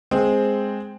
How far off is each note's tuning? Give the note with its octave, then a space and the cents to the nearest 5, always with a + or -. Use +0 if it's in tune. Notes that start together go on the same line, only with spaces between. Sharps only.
G#3 -5 C4 +0 G#4 +0